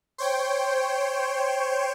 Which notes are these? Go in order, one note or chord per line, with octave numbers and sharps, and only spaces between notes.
C5 C#5 G5